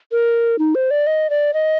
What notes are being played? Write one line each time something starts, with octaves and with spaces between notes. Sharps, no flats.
A#4
D#4
C5
D5
D#5
D5
D#5